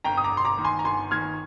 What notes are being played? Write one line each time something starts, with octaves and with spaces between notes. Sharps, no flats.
G1 G5 A#5
D#6
A#5 D6
G1
C6
A#5 D6
D#3
G#5 C6
A#5
G1 G#5 C6
D#3 F6 G#6